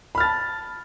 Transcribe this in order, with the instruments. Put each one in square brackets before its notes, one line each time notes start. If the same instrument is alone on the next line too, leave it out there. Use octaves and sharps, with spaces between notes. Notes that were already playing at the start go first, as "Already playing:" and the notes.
[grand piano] B5
F6
A6
A5